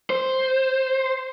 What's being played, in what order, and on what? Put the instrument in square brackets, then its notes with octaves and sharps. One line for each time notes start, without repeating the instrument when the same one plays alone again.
[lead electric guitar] C5